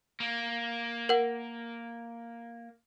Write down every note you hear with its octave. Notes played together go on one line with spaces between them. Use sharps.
A#3
A#4 F#5